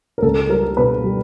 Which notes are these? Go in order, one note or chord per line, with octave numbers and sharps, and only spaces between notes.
A#4
C#2 A4
G3 A#4
B2 B4
G3